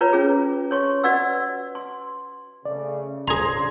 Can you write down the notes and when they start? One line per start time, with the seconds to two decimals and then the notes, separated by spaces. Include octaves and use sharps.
0.01 F4 B4 C#5 A#5 B5
0.13 C#4 F4 G#4
0.71 C#5 C6 C#6
1.04 F#4 B4 D5 D#5 F#5 E6
1.75 C6
2.65 C#3 A3 D5
3.28 C#3 F3 D4 G#4 A#5 C6 G#6 A#6